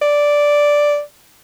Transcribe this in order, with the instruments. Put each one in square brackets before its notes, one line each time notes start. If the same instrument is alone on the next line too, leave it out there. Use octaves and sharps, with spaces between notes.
[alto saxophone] D5